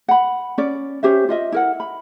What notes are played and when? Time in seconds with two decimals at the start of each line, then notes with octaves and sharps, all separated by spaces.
0.08 F#5 B5
0.58 C#4 D5
1.03 C#4 G4 C5 E5
1.29 F4 D#5 E5
1.52 E4 A#4 F#5
1.80 B5